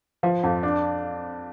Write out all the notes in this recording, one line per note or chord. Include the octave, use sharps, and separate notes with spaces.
F3
F2
D4